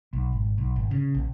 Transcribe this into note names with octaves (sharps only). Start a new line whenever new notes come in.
B1
G#1
B1
G#1
C#3
A#1